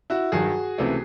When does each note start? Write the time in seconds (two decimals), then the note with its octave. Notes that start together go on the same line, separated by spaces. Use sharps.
0.10 E4 F#4
0.32 G2 D#3 F#3 F#4 G#4
0.78 C#2 C3 E3 A3